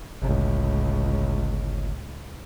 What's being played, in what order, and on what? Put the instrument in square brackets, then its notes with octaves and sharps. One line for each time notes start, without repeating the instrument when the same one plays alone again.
[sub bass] G1 [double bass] C#2 A2